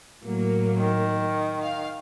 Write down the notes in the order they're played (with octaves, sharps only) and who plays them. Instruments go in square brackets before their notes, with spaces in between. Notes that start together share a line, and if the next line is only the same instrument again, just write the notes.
[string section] A2 F#3 A#3
[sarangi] D#3
[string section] F5